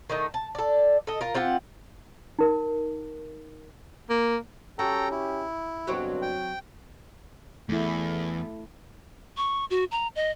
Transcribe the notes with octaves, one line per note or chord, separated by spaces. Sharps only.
D#3 A3 D#4
A5
A4 D5
A4 D#5
F4 A#4
C4 F4 G4 F#5
D#4 A#4
A#3
C#4 F#4 G4 A4 G5 A#5
E4
G2 B2 D3 F#3 C4 F#4
G5
E2 A3 E4
C#6
F#4
A#5
D#5